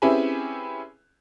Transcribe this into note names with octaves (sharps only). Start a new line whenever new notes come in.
C4 C#4 E4 G4 G#4 B4